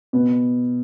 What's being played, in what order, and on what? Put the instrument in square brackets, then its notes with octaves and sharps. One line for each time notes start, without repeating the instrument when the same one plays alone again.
[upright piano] B2 B3